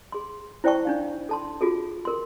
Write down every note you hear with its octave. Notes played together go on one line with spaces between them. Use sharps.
G#4 C6
E4 C5 D5 G5 A5 C#6
D4 D#4 F5
A4 A5 C6
F4 F#4 G#4 A4
A4 A#4 C6